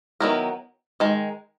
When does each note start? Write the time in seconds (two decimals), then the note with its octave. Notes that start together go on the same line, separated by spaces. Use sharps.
0.20 D#3 F#3 B3 E4 A#4
1.00 D#3 G#3